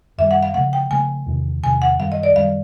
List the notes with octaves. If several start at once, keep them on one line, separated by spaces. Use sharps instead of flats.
F#2 D#3 G3 E5
F#5
F5
C#3 F3 A3 F#5
G5
C#3 F3 A3 G#5
E2 C3 D#3
E2 C3 D#3 G#5
F#5
F#2 D#3 G3 F5
D#5
D5
F#2 D#3 G3 F5